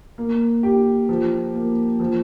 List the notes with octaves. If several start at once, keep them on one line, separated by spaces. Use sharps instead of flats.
A#3
G4
F3
A#3
F3